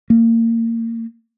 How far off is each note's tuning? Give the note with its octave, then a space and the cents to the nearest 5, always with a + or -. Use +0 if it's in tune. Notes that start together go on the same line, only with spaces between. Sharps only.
A#3 -30